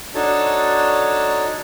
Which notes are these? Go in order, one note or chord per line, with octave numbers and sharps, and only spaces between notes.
D4 D#4 F#4 A4 C#5 A5